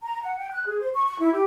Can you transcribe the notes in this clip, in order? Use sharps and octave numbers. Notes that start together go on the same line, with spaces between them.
A#5
F#5
G5
F#6
G#4
C5
C#6
C#6
E4
G4